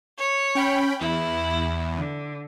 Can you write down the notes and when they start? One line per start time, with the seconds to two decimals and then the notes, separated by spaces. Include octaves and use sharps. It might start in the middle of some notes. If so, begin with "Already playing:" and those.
0.18 C#5
0.55 C#4 G5 B5
1.01 E2 E4
1.96 D3